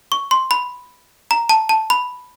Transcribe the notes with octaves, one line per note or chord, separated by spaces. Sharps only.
C#6
C6
B5
A#5
A5
A5
B5